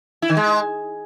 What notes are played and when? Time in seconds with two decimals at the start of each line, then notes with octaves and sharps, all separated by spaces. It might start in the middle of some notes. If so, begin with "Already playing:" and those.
0.22 E4
0.30 D#3
0.37 G#3